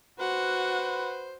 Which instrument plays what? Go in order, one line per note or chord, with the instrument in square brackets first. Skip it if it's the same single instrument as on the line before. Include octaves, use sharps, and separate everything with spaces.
[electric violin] F#4 F#5 [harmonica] B4 C5